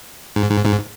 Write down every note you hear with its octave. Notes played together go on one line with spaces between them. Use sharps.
G#2
G#2
G#2